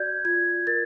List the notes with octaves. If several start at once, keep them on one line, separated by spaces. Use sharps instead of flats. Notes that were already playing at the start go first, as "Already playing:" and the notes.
Already playing: F#4 D5 G6 G#6
F4 G#6
A#4 A6